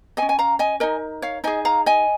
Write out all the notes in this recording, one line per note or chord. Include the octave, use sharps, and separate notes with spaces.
G#4 D#5 G#5
C#4
G#5
F5 A#5
D#5 G#5
D#4 A#4 D#5 G#5
C#5 F5
D#4 G#4 D#5 G#5
F5 A#5
D#5 G#5